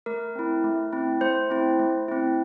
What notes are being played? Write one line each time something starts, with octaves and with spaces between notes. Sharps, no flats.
A3 A#4
C4 E4
A3
C4 E4
A3 C5
C4 E4
A3
C4 E4